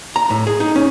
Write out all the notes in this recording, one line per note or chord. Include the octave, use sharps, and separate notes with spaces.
A#5
A2
G#4
D#4
C#4